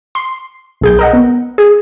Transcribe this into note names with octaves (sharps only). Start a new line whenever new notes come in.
C6
B1 G#4 G6
A#4 D#5 F#5
B3
G#4